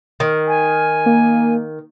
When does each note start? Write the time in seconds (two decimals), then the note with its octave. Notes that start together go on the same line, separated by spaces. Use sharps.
0.20 D#3
0.48 G#5
1.06 A#3